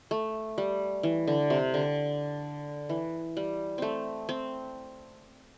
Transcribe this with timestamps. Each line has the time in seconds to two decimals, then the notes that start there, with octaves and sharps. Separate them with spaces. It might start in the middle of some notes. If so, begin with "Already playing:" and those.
0.11 A3
0.58 G3
1.03 E3
1.27 D3
1.50 C3
1.74 D3
2.89 E3
3.37 G3
3.78 A3 C4
4.29 C4